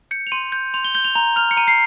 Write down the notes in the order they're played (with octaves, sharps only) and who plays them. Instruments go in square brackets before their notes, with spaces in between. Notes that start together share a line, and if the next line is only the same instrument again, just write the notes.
[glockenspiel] G6 C#7
F7
C6 D#7
G6
C6 F7
G7
G6 G7
F7
A#5 F7
F6 F7
C#7
A#5 D#7
C7